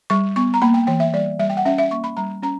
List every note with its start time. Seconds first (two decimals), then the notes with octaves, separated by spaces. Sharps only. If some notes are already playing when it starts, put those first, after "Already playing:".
0.10 G3 C#6
0.36 B3 C#6
0.54 A#5
0.62 A#3 B5
0.74 G5
0.87 E3 G5
1.00 E5
1.13 G3 D5
1.39 G3 E5
1.50 G5
1.57 F#5
1.65 C#4 E5
1.78 E5
1.91 A#3 C#6
2.04 B5
2.17 G3 A#5
2.43 C#4 A#5